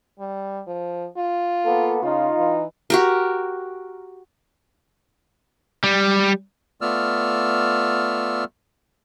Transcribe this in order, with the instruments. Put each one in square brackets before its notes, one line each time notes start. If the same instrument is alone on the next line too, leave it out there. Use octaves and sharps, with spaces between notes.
[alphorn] G3
F3
F4
[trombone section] A#3 B3 A4
[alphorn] C#3 [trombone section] D#4 F4
[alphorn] E3
[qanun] F#4 G4 A#4
[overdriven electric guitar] G3
[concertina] A3 B3 F4 D5 E6 F6